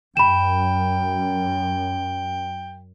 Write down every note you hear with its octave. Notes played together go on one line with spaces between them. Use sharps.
F#2 G5 B5 E7